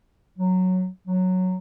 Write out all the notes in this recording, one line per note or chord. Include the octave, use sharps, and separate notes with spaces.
F#3
F#3